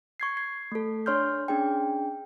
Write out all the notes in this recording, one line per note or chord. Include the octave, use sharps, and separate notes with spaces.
C#6 G#6 C7
G#6 C7
A3 A4
D4 C#5 C6 F6 G6
C#4 D4 G#4 G5